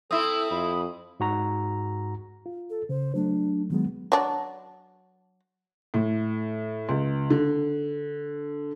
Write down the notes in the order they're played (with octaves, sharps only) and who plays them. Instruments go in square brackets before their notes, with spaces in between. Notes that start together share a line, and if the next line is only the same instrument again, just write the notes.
[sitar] C4 E4 [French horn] A4 [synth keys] D#6 [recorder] E6
[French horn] F2 [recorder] B5
[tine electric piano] G#2 F#4 A#5
[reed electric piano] F4
[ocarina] A4
[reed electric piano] C#3 [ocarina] C5
[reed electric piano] F#3 A3 [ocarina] D4
[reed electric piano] D#3 F#3 G#3 [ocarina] B3
[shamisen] F#3 D4
[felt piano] A2
C#2
D3